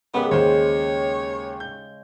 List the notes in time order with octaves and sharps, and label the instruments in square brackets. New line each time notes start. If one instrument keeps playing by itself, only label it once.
[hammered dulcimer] C#3 G#3 [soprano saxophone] B3 [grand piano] G4 A#4 B4
[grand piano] D#2 C5 [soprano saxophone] C#5
[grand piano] G6